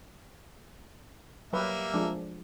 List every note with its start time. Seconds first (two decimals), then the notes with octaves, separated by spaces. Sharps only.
1.53 F#3 G3 A#3 B4 E5
1.94 F3 G#3 D4